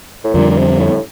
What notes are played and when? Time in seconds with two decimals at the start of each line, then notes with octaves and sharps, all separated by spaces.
0.24 A2
0.34 F2 A#2 D3 G3 D4
0.51 A#2
0.57 C3
0.79 A2